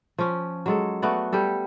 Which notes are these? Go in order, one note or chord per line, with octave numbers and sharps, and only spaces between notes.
F3 C#4
F#3 G#3 A4
A3 B3 F#4 D5
G3 G4 A4